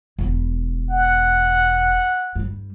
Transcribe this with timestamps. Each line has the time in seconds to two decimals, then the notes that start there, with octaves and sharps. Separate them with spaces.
0.19 E1 E4
0.90 F#5
2.36 G2 G3